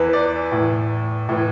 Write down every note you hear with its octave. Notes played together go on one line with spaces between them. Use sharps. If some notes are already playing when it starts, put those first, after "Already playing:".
Already playing: E2 E3 B4
D5
A2 E3
A2 E3